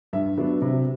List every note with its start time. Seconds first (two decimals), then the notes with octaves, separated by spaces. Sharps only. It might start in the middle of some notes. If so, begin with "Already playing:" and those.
0.13 G2 E5
0.38 F#3 B3 D4
0.62 C3